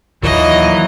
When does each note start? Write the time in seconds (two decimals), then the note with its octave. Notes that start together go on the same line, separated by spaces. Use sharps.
0.23 D#2 A#2 E3 F#3 D#5